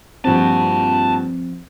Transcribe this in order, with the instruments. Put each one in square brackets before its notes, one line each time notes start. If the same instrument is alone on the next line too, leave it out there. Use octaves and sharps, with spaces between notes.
[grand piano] G2 A#2 F#4 [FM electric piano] F3 C4 [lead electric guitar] G5 A5